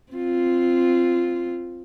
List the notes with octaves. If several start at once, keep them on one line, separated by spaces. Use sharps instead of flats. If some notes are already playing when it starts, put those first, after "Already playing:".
C4 F4